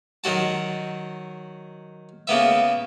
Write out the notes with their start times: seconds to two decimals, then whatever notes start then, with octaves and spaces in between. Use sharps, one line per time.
0.24 D#3 F#3 F#4 A5
2.27 C#3 A#3 B3 E5